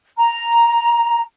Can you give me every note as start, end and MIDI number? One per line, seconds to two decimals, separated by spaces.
0.18 1.20 82